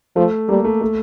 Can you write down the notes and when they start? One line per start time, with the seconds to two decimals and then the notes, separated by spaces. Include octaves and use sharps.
0.16 F3 A3
0.49 G3 A#3
0.65 A3
0.81 A3